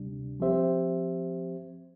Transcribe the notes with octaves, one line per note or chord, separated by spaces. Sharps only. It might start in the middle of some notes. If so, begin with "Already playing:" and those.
Already playing: D2 C3 G3 D4
F3 C4 G4 C5 E5